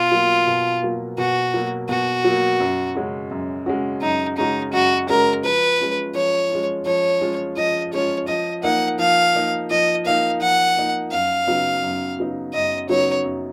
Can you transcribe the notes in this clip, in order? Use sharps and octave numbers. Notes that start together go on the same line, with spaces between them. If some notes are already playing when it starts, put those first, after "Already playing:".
Already playing: B2 F4
F#3 A#3
B2
F#3 A#3
B2 F#4
F#3 A#3
B2 F#4
F#3 A#3
F#2
C#3 G#3 C#4 F#4
F#2
C#3 G#3 C#4 F#4
F#2 D#4
C#3 G#3 C#4 D#4 F#4
F#2 F#4
C#3 G#3 C#4 F#4 A#4
F3 B4
G#3 C#4 F4
F3 C#5
G#3 C#4 F4
F3 C#5
G#3 C#4 F4
F3 D#5
G#3 C#4 F4 C#5
F3 D#5
A#3 D#4 F#5
F3 F5
A#3 D#4
F3 D#5
A#3 D#4 F5
F3 F#5
A#3 D#4
F#2 F5
C#3 F#3 B3 D#4
F#2
C#3 F#3 B3 D#4
F#2 D#5
C#3 F#3 B3 D#4 C#5
F#2